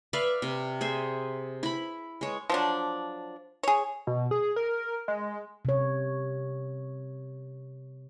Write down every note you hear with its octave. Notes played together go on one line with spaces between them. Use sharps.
B4 D5 E5 F5
C3
G#4 C5 E5
E4 B5
G#3 C#5
F3 F#3 D4
G#4 C#5
B2
G#4
A#4
G#3
C3 C#5